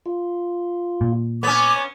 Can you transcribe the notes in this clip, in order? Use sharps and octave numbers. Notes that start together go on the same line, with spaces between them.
F4
A#2
B3 C#4 C#5 A#5 D6